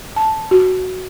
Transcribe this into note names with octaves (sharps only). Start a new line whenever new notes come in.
A5
F#4